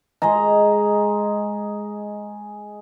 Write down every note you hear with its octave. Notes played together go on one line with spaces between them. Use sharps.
G#3 G#4 D#5 A#5